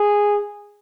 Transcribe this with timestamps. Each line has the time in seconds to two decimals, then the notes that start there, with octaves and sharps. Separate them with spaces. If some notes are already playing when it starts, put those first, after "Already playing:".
Already playing: G#4